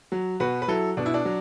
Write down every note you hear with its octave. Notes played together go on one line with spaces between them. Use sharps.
F#3
B2 F#4 B4
B4
F#3 E4 A4
B2 D4
E4
D4
F#3